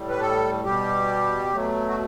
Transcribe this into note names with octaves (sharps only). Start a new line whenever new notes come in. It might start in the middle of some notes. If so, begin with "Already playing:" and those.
Already playing: A2 G3
B4
A4
B2 G3 G4
B2 F#3 A3
F#4